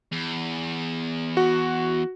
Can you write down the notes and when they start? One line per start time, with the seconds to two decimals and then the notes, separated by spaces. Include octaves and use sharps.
0.12 E2
1.37 F#4